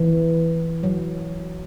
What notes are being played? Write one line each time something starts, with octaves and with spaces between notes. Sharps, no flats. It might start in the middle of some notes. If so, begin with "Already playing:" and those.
Already playing: E3
F#3